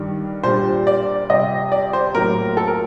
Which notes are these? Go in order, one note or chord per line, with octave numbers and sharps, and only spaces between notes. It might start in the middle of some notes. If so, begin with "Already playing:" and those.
Already playing: G2 D#3 G3 D4
A#2 G3 D4 C5
D5
C3 G3 C4 D#5
D5
C5
A2 F#3 A#3 A#4
A4
A#4